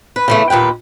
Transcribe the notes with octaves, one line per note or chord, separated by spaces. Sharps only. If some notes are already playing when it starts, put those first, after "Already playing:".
B4
C#3 E3 A3
D#2 A#2 B4 G5